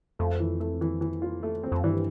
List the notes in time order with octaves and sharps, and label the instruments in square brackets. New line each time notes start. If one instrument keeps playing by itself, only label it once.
[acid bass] F2 [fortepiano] A3
[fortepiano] E3
A3
E3
E3
F4
A3
C4
[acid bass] F2
[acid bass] G2 [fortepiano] E3